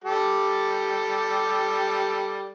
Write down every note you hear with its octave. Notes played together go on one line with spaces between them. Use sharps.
G3 G4 A4